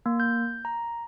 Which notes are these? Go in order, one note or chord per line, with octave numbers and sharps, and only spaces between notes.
A#3
G6
A#5